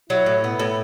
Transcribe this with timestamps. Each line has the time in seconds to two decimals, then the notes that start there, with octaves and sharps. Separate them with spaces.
0.10 F#3 E4
0.26 A2
0.44 B3
0.60 A2